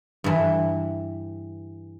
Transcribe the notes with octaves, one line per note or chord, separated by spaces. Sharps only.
G2 E3